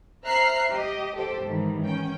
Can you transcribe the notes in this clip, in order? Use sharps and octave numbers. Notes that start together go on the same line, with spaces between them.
C5 E5 A#5 F6 F#6 C7
G4 D#5
G4 A4 C5
G#2 D#3 E3 G3
C#4 G5